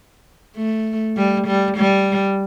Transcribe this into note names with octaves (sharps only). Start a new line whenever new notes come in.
A3
G3
G3
G3